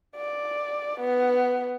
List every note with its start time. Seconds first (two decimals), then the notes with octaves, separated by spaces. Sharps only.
0.16 D5
1.00 B3